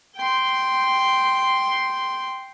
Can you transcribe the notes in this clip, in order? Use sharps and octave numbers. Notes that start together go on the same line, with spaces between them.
G5 C6